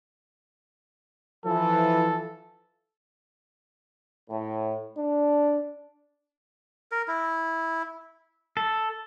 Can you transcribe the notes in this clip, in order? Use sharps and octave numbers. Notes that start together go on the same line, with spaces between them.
E3 F3 A4
A2
D4
A#4
E4
A4